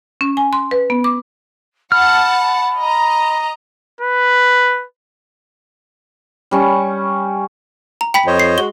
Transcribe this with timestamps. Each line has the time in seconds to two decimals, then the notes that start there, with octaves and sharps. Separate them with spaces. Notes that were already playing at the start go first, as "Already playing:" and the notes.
0.21 C#4
0.37 G#5
0.53 C6
0.71 B4
0.90 B3
1.04 D6
1.92 F#5 A5 B5 F6
2.80 D#5 A#5
4.00 B4
6.51 G3 C#4 C#6
8.01 A#5
8.14 G5 B5 B6
8.27 F2 C5 C#5 D#5
8.40 C7
8.58 G#3 F#4 G7